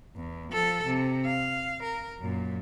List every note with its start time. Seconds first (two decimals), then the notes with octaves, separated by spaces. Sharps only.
0.16 E2
0.52 F3 A4
0.85 C3
1.26 F5
1.83 A#4
2.20 F#2 A#2